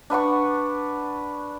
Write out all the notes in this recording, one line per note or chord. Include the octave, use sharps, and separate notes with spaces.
D4 B4 F#5 C#6